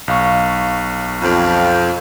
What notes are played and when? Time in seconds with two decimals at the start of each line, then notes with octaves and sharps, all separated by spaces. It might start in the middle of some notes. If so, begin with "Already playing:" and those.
0.08 B1 F5 C#6
1.21 F2